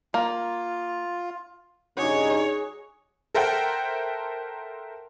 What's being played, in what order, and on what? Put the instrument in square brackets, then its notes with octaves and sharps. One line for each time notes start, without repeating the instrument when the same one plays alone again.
[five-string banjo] A#3 [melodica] F4
[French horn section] G2 C#3 D#4 [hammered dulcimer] F#4 G#4 D6 [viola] C#5
[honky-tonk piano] A4 A#4 C5 E5 F#5 G5